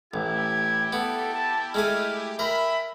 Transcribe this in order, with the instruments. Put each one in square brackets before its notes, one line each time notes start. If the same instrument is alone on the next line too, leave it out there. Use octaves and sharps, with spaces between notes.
[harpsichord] A1 [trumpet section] E4 G4 [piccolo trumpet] G#6
[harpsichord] B3 [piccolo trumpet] A4
[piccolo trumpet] A5
[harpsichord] G#3 A3 G#5 [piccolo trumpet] F6
[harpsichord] A#4 [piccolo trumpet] E5 [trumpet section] G5 G#5 B5